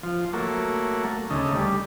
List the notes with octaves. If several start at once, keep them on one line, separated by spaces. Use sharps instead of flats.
F3
F#3 A3 A#3
D2 C#3 A3 D#4
G3